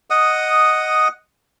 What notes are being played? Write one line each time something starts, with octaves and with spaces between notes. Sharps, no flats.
D#5 F#5 D#6